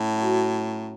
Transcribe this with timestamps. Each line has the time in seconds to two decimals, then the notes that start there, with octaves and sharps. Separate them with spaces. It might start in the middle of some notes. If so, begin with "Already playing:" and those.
Already playing: A2 C#4 E4
0.16 F#3